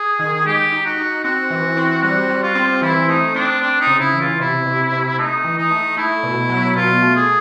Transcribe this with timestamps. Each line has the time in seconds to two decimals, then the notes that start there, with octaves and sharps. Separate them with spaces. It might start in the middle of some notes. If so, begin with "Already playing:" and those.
Already playing: G#4
0.19 D#3
0.46 G#3 G4
0.72 D#4
0.85 F#4
0.98 D#4
1.24 C4 F#4
1.50 E3
1.77 C4
2.03 G3 F#4
2.29 G3
2.43 F4
2.55 C4
2.82 E3 E4
3.08 A3 D#4
3.34 C4 D4
3.61 C4 D4
3.80 D#4
3.87 C#3
3.99 E4
4.13 E3
4.20 F4
4.40 C3 E4
4.66 C3
4.92 C3
5.18 A3 D#4
5.44 E3
5.58 D#4
5.71 A3
5.97 A3 E4
6.23 B2
6.49 F#3
6.75 B2 F4
7.02 A3
7.15 G#4